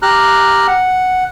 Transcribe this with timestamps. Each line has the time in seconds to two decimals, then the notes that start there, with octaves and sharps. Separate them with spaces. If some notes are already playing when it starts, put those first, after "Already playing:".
0.02 G4 A#5 F6 F#6
0.67 F#5